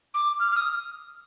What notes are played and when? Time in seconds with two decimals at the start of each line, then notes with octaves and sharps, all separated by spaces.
0.14 D6
0.39 F6
0.51 F6
0.56 D#6